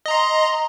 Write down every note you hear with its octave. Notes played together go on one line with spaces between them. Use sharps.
D#5 A#5 C6